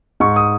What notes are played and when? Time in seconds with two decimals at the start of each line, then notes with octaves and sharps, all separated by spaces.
0.20 G#2 C#6
0.36 D#6